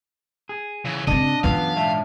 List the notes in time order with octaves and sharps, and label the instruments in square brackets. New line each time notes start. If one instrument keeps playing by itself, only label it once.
[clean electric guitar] G#4
[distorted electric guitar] C#3 E3
[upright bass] C#3 C4 [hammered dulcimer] D4 [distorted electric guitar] D#5
[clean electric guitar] F#2 B3 B4 [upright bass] E3 F4 [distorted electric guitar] F5
[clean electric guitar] G#2 E5 A5